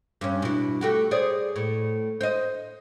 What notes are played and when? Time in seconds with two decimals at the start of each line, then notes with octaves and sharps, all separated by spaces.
0.21 G2 C#4
0.42 B2 E4
0.81 A3 F#4 G4
1.11 G#4 C5 D5
1.56 A2
2.21 C5 D#5